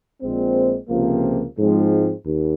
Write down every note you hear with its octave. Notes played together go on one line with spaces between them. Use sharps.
A#1 A#2 G#3 C4
C#2 C3 F3 A#3
G#2 F3 G#3 C4
D#2